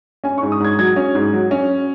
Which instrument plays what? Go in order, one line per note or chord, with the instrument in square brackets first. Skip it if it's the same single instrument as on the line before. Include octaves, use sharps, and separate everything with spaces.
[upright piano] C#4 G#5
C#6
G#2
D#6
G#2 G#6
F#3 G#6
C#4
G#2
F#3
C#4